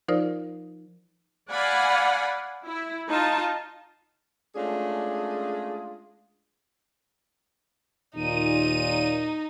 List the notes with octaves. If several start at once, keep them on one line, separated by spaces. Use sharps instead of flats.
F3 D#4 F4 A#4 C5 D5
D5 F5 F#5 G#5 B5
E4
D#4 F4 A5
G#3 A3 C#4 D4 F4 G#4
D#2 A#2 D#4 D#7